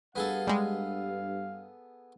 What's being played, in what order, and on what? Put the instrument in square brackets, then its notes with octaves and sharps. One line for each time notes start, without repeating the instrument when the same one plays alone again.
[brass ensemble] G2 F5 [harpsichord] B3 G#4 A4
[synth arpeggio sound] G3 G#3